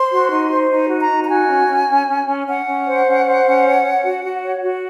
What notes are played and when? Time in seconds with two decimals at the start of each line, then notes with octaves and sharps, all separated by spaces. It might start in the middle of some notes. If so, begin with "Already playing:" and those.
Already playing: C5 C6
0.11 F#4
0.30 D#4
0.51 C5
0.70 D#4
0.89 F#4
1.00 A#5
1.10 D#4
1.24 A#5
1.28 F#4 G#5
1.49 C#4
1.68 C#4
1.88 C#4
2.07 C#4
2.27 C#4
2.47 C#4 F#5
2.67 C#4
2.86 C5
3.05 C#4
3.25 C5
3.45 C#4
3.64 C#5
3.84 C#5
4.03 F#4
4.24 F#4
4.42 C#5
4.63 F#4